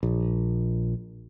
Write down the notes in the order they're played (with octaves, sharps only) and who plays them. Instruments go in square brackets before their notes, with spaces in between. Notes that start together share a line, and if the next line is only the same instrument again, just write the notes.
[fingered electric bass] A#1